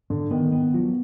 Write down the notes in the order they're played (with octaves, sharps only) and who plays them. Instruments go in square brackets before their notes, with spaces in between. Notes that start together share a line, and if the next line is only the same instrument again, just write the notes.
[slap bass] G#2 [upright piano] D3
[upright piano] D#3 [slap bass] B3
[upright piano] D#3 [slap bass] B3
[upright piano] F3 [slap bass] F#3